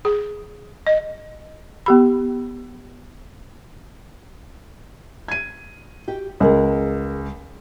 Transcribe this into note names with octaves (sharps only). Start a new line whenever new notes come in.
G#4
D#5
B3 G4 B5
G#6 D#7
F#4 G4 G5
C#2 G#4 A#4 F#5